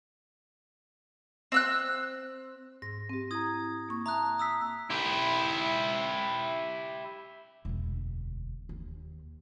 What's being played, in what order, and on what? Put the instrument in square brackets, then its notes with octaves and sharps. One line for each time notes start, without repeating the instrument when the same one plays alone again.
[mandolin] C4 E6 F#6
[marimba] G#2 [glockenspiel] A#6
[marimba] C4 G4
[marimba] E4 A#5 [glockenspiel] D#6 G#6
[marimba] A#3 C#6
[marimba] E5 A5 [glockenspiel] A#5 D#6 F#6
[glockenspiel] D#6 E6 B6
[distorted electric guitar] E4 G4
[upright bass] E1 D2
D#2